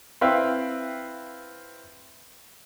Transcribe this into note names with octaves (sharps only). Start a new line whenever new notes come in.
C4 E4 B4 E5 F5 G5